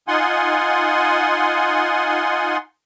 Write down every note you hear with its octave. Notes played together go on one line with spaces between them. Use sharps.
D#4 F4 F#5 G#5 C6